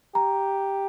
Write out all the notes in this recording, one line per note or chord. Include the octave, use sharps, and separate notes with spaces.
G4 A#5